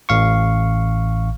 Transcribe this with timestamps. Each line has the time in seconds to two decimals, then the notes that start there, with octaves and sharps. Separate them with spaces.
0.09 A1 F5 C#6